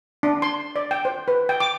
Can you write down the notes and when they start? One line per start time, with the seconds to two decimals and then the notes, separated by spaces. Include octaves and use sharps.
0.23 D4
0.42 C6
0.76 D5
0.91 G5
1.05 C5
1.28 B4
1.49 G5
1.60 D6